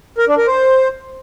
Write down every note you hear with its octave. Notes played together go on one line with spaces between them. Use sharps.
A#4
D4
A#4
C5